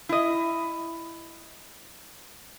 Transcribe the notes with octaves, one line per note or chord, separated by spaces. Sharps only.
E4 D#5